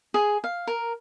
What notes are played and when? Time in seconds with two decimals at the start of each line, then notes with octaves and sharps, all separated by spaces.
0.14 G#4
0.44 F5
0.67 A#4